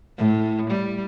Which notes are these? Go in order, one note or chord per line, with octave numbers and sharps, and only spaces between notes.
A2
G3